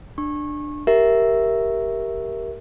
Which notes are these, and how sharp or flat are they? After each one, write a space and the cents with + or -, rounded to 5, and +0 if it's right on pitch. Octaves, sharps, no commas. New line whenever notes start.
D4 +15 C#6 -25
G4 +0 A#4 +0 E5 +0